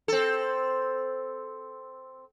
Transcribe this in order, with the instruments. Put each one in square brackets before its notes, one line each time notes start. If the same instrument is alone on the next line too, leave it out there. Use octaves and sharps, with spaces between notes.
[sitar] C4 A4